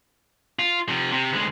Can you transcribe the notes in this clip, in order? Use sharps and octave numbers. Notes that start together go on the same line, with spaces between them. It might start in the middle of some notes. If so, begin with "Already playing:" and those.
F4
C3 F3
C3
D2 G#3